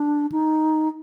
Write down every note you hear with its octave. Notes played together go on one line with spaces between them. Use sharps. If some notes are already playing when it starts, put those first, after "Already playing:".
Already playing: D4
D#4